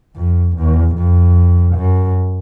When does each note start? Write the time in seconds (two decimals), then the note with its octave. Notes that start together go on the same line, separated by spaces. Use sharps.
0.16 F2
0.56 E2
0.96 F2
1.75 F#2